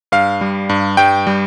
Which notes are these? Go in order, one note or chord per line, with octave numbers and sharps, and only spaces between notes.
G2 F5
G3
G2
G2 G5
G3